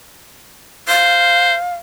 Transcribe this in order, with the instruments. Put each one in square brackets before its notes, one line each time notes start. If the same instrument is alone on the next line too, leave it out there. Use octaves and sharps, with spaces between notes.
[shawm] C5 [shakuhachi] F5